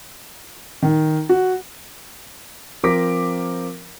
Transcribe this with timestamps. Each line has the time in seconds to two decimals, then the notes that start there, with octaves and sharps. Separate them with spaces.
0.82 D#3
1.29 F#4
2.83 F3 C4 A#4 D6 A#6 B6